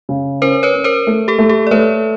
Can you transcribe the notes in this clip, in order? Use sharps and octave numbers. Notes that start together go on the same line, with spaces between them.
C#3
C#4 A#4 C5
B4 C#5
C#4
A#4 C5
A3
G4 A4
A3
G4 A4
D5
A3 B4 C#5